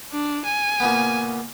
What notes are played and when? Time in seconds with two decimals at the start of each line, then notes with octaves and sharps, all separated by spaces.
0.12 D4
0.45 G#5
0.80 A#2 C#3 B3